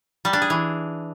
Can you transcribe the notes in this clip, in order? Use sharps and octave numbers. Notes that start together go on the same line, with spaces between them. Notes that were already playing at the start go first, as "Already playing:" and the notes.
G3
D4
G#4
E3